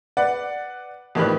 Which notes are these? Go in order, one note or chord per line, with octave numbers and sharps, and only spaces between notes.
B4 D5 F#5
F2 A2 D#3 G3 B4 F#6